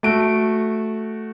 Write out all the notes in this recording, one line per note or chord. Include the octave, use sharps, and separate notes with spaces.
A3 F#4 D7